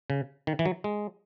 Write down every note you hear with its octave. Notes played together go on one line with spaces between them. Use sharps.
C#3
D#3
E3
F#3
G#3